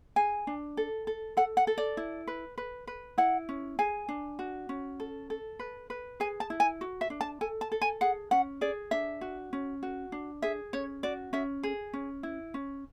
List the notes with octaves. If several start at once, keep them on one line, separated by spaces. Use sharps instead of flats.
G#4 G#5
D4
A4
A4
A4 F#5
F#5
A4
D5
E4
B4
B4
B4
E4 F#5
C#4
G#4 G#5
D4
F#4
C#4
A4
A4
B4
B4
G#4 G#5
A5
E4
G#5
F#4
E5
D4
A5
A4 G#5
A5
A4
G#5
G#4 F#5
C#4 F#5
G#4 D5
D4 E5
F#4
C#4
F#4
D4
G#4 E5
C#4 C#5
F#4 D5
C#4 E5
G#4
C#4
E4
C#4